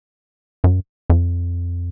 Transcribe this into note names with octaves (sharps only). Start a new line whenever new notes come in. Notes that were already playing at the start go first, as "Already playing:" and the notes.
F#2
F2